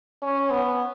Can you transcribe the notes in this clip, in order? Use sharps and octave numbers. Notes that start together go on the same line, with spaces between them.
C#4
B3